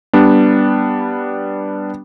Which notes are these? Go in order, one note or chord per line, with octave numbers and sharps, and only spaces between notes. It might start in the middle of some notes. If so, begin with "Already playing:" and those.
G3 B3 D4